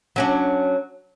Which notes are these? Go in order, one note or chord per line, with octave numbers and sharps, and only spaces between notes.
F#3 C#4 D4